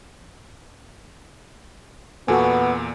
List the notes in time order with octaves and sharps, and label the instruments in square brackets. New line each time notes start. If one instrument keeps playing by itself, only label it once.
[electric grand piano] E2 A#2 [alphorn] B3 [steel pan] F#4 A4 G#5